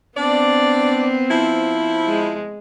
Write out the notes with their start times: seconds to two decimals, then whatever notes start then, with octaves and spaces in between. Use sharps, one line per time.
0.17 B3 C4 D4 D5
1.31 F3 E4
2.07 G#3